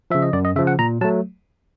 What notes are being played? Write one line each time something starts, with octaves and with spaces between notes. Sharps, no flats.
C#3 F3 E5
D#5
F#2 D5
D#5
C#3 F3 E5
F#5
A#2 A#5
F#3 A3 A5